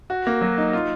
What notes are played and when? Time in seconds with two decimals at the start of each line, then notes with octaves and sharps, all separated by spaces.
0.10 F#4
0.27 A#3
0.41 F#3
0.58 D#4
0.73 F4